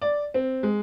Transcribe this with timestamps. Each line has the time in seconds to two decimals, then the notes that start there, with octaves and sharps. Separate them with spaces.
0.02 D5
0.34 C4
0.63 G#3